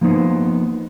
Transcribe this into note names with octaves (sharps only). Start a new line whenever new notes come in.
F3 A#3 B3 D#4 C5